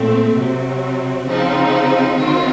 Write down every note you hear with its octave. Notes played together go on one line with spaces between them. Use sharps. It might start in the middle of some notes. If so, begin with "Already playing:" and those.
Already playing: A#2 A3 C4
C3 F#3 C4
C#3 F3 C4 D#4
D#3 F#3 C4 F4